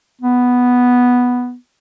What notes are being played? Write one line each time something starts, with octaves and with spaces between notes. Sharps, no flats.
B3